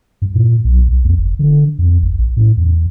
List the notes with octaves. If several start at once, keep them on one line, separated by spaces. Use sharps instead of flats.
G2
A#2
B1
C2
F2
F#1
D3
F2
G#1
A1
A2
E2